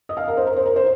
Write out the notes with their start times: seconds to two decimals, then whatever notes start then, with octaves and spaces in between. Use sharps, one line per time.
0.09 D#5
0.17 F5
0.28 A#4
0.37 C5
0.47 A#4
0.57 C5
0.66 A#4
0.76 C5